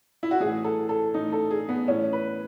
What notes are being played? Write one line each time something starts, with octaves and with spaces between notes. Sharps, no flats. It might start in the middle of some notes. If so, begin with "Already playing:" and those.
E4
F#4
A2 E3 G#4
A4
A4
A2 E3 D#4
A4
G#4
B3
A2 E3 C#4
B4